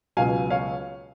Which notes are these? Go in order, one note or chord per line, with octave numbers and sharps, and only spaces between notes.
C#2 B2 F#3 F5 G#5
C#5 F5